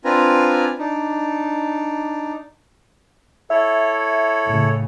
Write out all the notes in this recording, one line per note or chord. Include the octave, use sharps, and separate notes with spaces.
C4 D4 F4 B4 G#5 A#5
D4 D#4
E4 A4 C#5 E5
A2 C#3